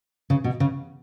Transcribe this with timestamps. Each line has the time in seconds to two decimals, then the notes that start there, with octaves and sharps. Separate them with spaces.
0.30 C#3
0.44 B2
0.60 C#3